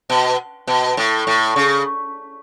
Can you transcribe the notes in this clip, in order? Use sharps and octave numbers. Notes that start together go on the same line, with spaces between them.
B2
B2
A2
A2
C#3